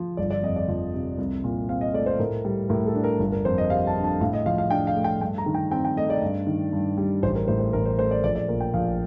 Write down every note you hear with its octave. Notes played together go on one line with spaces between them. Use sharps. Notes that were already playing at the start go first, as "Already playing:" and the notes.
Already playing: F3
G1 D5
D5
F2 D#5
D5
F3
C3
C2
A#2
C4 F5
D#5
A3 D5
C5
A2 A#4
G3
A2 A#4
A4
D4
A#4
G1
A#4
F2 C5
D#5
G3 F5
A5
D3
A5
A2 F5
D#5
F3 F5
F5
D4 G5
F5
A3
G5
G2 G5
A#5
D#3
G5
C4 G5
G5
A3 D#5
D5
G2
D#3
G2
G3
A1 C5
A#4
A2 C5
C5
A1 A#4
C5
A3 C5
D5
A#1 D5
D5
A#2 A#4
G5
A#1 F5